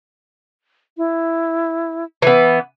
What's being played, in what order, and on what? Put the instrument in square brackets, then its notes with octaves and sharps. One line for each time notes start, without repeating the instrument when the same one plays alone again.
[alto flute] E4
[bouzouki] E3 B3